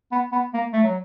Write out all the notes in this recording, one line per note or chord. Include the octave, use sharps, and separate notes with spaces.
B3
B3
A#3
A3
F#3